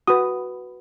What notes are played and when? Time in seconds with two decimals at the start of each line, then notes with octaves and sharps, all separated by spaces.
0.08 F#4 B4 D#6